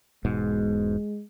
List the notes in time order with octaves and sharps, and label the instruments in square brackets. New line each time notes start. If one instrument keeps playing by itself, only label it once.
[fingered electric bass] E1 G#2 B2 [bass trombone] G#3